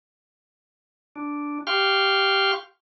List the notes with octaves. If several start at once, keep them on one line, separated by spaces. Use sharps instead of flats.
D4
G4 F5 G5 C6 C#6 F6